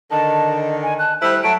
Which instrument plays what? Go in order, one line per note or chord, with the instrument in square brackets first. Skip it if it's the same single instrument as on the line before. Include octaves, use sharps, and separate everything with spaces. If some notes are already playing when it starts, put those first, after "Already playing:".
[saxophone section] D3 D#3 [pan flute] D#5 [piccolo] A5
[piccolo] G#5
[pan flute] A5 [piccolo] F#6
[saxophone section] G3 A3 E4 [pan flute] C5 [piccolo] F#6
[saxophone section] F#3 A3 [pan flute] A5 [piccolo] D7